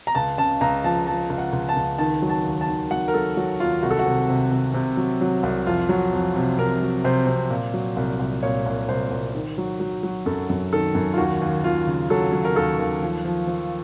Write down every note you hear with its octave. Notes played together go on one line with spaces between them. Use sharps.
A#5
C#2 A5
C#3 A5
C#2 A#5
F3 A5
F3 A5
C#2
F#5
C#2
A5
C#2
D#3 A5
F#3
A5
D#2
A5
D#3
F#3 F#5
A#4
F#3 A4
F#3 F#4
D#2 F4
C2 F#4
A4
F#4
C3
C3
C3
C3
F#3
F#3
C2
F2 F4
F#3
F2
C3
C3 A#4
F#3
C3 C5
C3
A#2
F#3
C2
C2
A#2 C#5
C2
C2 C5
C2
D#3
F#3
F#3
F#3
F#2 A4
F#2
D#3 A4
F#2
F4
D#2 F#4
D#2
D#2 F4
C#3
F#3 A4
F#3
A#4
D#2 A4
D#2
F3
F3
F3